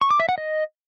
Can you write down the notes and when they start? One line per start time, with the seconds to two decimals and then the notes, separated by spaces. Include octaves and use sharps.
0.01 C#6
0.11 D6
0.20 E5
0.29 F#5
0.38 D#5